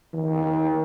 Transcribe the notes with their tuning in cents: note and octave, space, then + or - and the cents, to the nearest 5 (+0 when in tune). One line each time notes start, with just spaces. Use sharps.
D#3 +35